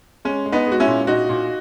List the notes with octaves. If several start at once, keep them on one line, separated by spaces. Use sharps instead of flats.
G#3 C#4
G#3
B3 D#4
G#3 F#4
C#4 E4
A#2
A#2 D#4 F#4
A#2